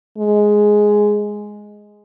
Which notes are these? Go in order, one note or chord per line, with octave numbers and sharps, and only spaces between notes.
G#3